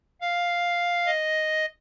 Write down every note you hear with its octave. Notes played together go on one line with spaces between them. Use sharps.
F5
D#5